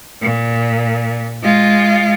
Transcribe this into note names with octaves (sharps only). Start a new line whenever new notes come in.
A#2
G#3 F4